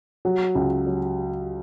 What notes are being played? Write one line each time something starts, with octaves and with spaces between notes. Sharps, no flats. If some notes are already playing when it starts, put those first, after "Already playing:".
F#3
C#2
F#3